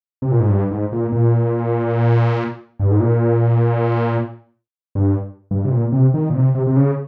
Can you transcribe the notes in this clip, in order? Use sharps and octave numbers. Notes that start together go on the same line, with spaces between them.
C3
A#2
G#2
G2
G#2
A#2
A#2
G2
G#2
A#2
G2
G2
C3
A#2
C3
D#3
A#2
C3
C3
C3
C#3